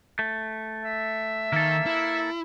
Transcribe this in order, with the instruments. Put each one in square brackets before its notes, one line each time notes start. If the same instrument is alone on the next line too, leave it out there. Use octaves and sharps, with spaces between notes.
[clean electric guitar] A3
[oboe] E5
[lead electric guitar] D#3 [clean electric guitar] A#3 A4
[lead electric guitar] E4